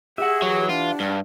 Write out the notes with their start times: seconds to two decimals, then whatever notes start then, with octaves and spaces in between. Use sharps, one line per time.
0.18 G4 G#4 E5 F#5
0.42 E3 F#3
0.69 D4 F4
1.00 G2